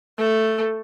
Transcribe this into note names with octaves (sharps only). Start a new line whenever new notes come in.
A3 A4